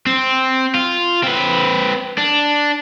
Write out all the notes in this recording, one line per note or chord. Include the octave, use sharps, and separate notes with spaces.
C4
F4
C4 B4
D4